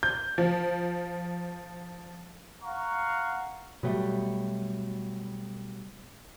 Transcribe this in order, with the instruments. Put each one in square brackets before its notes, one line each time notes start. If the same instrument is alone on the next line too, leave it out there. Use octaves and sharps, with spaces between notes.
[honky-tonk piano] G6
F3
[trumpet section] F5 F#5 A#5 C#6
[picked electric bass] B2 F#3 G3 A3